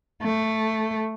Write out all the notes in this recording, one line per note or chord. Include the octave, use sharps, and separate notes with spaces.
A3